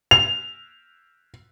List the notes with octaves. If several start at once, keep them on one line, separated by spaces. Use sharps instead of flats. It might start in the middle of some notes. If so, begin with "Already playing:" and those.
F7